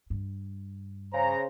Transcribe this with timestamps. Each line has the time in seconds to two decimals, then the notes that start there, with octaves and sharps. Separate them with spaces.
0.10 G2
1.13 C#3 C5 A#5